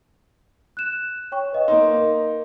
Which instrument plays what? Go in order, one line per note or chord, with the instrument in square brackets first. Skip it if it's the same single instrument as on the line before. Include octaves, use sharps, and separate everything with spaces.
[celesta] F#6 E7
C#5 G5 C#6
B4 D#5 F5
[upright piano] A#3 D#4 [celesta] C6